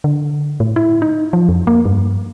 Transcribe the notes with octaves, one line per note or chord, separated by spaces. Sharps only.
D3
A2
E4
D#4
F3
F2
A#3
G2